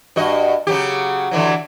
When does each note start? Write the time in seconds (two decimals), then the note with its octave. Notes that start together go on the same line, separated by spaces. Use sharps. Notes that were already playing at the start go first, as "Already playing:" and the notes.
0.16 G2 F#4 D#5
0.67 C#3 F#3 G4
1.31 D3 E3 F#3